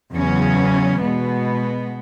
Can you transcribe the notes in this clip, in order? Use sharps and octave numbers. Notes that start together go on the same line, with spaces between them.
E2 C#3 F#3 C#4
B2 G#3 B3